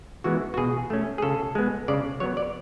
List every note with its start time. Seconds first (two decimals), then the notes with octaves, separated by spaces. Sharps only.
0.24 E3 G#3 B3 F#4
0.54 F#4
0.57 B2 G#4
0.90 A3 C#4
1.18 G#4
1.22 C#3 A4
1.55 G#3 B3
1.88 C#3 D5
2.20 F#3 B3 C#5
2.37 D5